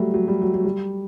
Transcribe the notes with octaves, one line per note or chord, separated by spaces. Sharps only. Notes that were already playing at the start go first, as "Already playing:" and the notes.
Already playing: F#3 G3 A3
F#3
G3
F#3
F#3
G3